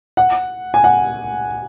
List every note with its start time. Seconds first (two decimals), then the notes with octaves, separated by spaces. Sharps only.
0.17 F#5
0.74 G#5
0.84 F#5